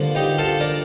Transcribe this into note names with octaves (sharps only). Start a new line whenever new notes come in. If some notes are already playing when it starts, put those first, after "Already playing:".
Already playing: G2 D3 F3 A#3
D#4 G4
F4 A4
A#4 D5